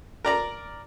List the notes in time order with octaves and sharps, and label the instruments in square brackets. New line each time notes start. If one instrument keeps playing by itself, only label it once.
[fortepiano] A#4 D5 A#5